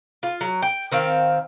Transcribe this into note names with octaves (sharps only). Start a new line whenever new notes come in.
F4
F#3
G5
D#3 C4 F5